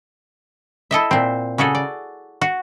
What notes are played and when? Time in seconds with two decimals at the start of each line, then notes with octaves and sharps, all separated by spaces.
0.91 E4 A4 D#5 E5
1.11 A#2 C4
1.58 C#3 F#4 G#4 A4
1.75 D5
2.41 F#4